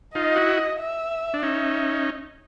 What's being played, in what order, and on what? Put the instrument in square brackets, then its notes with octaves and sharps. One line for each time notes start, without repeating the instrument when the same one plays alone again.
[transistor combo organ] D#4 F4 [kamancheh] D#5
[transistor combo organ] E4 F#4
[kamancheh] E5
[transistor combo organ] D4
[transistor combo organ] C#4 D#4 [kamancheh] E5